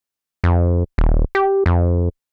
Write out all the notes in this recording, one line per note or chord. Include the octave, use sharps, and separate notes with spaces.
F2
D#1
G4
F2